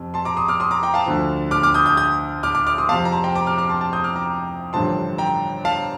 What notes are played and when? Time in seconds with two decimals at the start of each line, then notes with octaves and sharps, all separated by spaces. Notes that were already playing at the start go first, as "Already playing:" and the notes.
Already playing: F2 C3
0.14 A5 C6
0.25 A#5 D6
0.37 C6 D#6
0.48 D6 F6
0.60 C6 D#6
0.71 A#5 D6
0.83 G5 A#5
0.94 F5 A5
1.06 D2 D3 F3
1.51 D6 F6
1.63 D6 F6
1.74 D#6 G6
1.86 D#6 G6
1.97 D#6 G6
2.43 D6 F6
2.55 D6 F6
2.67 D6 F6
2.78 C6 D#6
2.89 F2 C3 F3 F5 A5
3.05 A#5
3.12 A5 C6
3.24 G5 A#5
3.35 A#5 D6
3.46 D6 F6
3.58 D6 F6
3.69 A5 C6
3.81 A5 C6
3.93 D#6 G6
4.04 D6 F6
4.16 A#5 D6
4.73 A1 G2 D3 F3 A5 C6
5.18 G5 A#5
5.65 F5 A5